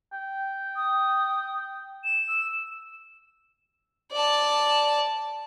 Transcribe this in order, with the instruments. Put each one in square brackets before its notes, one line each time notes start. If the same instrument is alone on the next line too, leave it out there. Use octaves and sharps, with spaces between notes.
[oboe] G5
[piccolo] D#6
E7
[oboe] E6
[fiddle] D5 A5